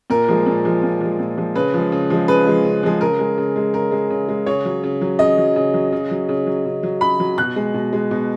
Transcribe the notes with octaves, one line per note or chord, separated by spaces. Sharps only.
A#2 A#4
F3 G#3
A#2
F3 G#3
A#2
F3 G#3
A#2
F3 G#3
C#3 B4
F3 G#3
C#3
F3 G#3
C#3 B4
F3 G#3
C#3
F3 G#3
C#3 A#4
G#3
C#3
G#3
C#3 A#4
G#3
C#3
G#3
C#3 C#5
F#3
C#3
F#3
C#3 D#5
F#3
C#3
F#3
C#3
F#3
C#3
F#3
C#3
F#3
C#3 B5
F#3
B2 F#6
G#3
B2
G#3
B2